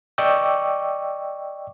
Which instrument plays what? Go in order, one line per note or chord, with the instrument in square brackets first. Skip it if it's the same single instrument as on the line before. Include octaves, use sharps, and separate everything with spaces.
[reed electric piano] D5 D#5 G5 C#6 D6 E6